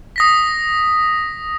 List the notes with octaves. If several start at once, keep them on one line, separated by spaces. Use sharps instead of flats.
D#6 A#6 B6